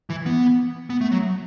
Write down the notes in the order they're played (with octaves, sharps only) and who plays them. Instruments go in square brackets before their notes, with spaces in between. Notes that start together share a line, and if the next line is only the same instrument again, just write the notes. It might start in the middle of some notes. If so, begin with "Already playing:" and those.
[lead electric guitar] E3
B3
B3
A3
F#3